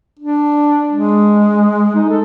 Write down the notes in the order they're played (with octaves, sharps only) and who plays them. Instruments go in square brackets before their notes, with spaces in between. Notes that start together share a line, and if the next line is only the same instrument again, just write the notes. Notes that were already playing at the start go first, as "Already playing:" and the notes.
[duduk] D4
G#3
D#4
A4